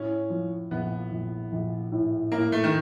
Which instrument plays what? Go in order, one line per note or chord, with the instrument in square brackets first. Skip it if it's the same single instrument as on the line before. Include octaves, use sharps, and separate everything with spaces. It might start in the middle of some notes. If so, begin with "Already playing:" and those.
Already playing: [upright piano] A2 [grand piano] C#4
[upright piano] F3
[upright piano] A#1 [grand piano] B3
[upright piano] A#1
A#1
A2
[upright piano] A2 [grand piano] A#3
[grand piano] A3
D#3